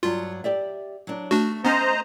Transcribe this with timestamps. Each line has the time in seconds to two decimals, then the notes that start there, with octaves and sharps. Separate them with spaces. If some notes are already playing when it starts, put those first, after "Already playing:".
0.03 G2 F#3 F4
0.44 G4 D5 E5
1.07 F#3 D4
1.31 A3 D4 F#4
1.65 B3 C#4 C5 D#5 A#5